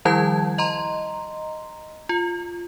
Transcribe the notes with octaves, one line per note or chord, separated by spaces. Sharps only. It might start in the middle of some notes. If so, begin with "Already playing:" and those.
D#3 F3 G3 E4 A5 G#6
D#5 A#5 C6
F4